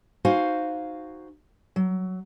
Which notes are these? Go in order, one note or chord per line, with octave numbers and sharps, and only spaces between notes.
D#4 F#4 C5 F5 G#5
F#3